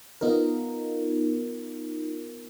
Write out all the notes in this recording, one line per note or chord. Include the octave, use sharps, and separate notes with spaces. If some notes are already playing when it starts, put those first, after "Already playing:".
B3 D#4 F4 A#4